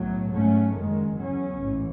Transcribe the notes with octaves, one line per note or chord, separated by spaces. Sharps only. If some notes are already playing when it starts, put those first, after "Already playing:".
Already playing: B1 A2 F#3
G#2 F#3 A3 C#4
F#1 F#2 D#3 G#3
E2 C#3 F#3 C#4
A1 G#2 E3